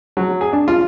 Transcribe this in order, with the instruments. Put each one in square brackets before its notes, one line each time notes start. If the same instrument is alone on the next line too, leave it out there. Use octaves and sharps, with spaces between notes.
[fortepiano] F#3
G#4
D4
F4